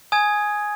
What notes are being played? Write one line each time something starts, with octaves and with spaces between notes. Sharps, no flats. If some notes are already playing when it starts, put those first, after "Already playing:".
G#5 D#6 G#6